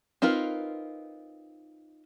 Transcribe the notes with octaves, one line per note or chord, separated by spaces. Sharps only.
C4 D#4 F4 A#4 B4